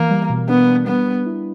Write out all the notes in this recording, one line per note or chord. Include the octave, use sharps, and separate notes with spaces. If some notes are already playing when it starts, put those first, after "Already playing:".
Already playing: E3 A#3
G3
B2
B3 D4
D4
G3 B3
G3
E4